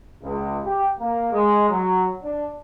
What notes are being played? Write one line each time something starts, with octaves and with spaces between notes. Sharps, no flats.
C#2
G4
A#3
G#3
F#3
D4